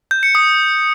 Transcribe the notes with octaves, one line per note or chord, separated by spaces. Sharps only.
G6
C#7
D#6